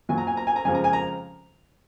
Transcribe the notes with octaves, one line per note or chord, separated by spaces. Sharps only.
A#2 F#3 G#5
A#5
G#5
A#5
G#5
A#5
F2 C#3 F3 G#3 G#5
A#5
G#5
A#5